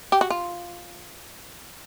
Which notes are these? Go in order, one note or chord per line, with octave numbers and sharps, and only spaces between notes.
G4
F#4
F4